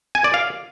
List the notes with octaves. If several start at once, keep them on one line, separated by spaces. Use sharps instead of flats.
G#5
D5
F5